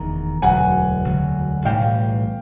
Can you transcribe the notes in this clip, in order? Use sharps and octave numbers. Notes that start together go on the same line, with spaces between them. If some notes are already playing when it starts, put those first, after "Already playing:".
Already playing: F1 E2 D#3 A#5
E1 D2 D3 F#3 F#5 G#5
E1 D2 D3 F#3
B1 A2 E3 G3 F5 G5